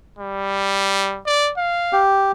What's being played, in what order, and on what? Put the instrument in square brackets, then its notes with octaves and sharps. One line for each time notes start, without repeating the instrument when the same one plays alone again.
[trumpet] G3
D5
F5
[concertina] G4